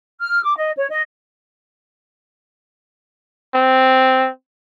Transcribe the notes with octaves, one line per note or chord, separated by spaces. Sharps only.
F6
D6
D#5
C#5
D#5
C4